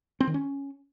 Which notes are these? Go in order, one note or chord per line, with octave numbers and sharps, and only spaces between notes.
C4
D#3
C#4